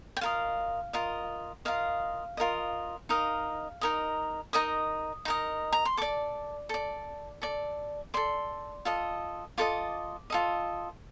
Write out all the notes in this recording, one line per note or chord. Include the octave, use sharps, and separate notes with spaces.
G5
F4 A#4 D#5 F5
F4 A#4 D#5
F4 A#4 D#5 F5
F4 A#4 D#5
D#4 A#4 D#5 F5
D#4 A#4 D#5
D#4 A#4 D#5 D#6
D#4 A#4 D#5
A#5
C6
A4 D5 D6
A4 D5
A4 D5
A4 D5 C6
F4 A4 D#5
F4 A4 D#5 D6
F4 A4 D#5